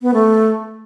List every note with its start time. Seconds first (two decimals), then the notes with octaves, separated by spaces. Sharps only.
0.02 B3
0.14 A3